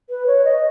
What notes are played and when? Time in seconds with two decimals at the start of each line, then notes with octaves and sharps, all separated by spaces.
0.10 B4
0.27 C#5
0.44 D#5